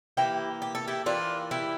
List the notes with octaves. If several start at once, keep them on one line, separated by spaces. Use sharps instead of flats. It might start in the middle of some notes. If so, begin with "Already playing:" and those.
E3 A#3 E4 G4
G4
A4
E4 G4
E3 A#3 D4 F4
E4 G4